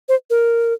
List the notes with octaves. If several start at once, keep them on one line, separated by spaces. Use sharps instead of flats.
C5
A#4